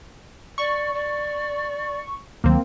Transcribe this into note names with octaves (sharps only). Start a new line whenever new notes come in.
D5 C#6
D5
D2 D#3 F#3 A#3 C4